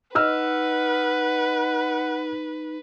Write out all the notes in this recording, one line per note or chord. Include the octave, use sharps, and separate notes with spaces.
D#4 B4 D#5 F#5 E6 F6